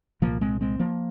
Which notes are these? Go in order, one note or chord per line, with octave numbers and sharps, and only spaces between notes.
C2 A#2 F3 A#3
G#3 C4
G#3 C4
F3 A#3